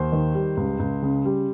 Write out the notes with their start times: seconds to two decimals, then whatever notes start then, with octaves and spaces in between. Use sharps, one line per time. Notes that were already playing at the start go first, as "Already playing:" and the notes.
Already playing: D#2 C5
0.12 D#3
0.35 G3
0.57 C#2
0.79 C#2
1.02 C#3
1.25 G3